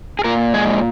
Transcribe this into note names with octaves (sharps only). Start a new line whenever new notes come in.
G#4
A#2 A#4
G#3 G#4